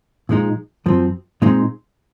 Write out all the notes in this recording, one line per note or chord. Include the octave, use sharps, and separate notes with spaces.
A#2 F3 G#3 D#4
F#2 F3 C4
A#2 G#3 C4 D#4